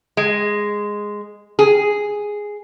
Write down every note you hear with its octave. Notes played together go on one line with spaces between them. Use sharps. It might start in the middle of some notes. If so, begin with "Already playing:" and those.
G#3
G#4